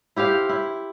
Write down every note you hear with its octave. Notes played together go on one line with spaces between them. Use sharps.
E4 G4 C5 F5
E4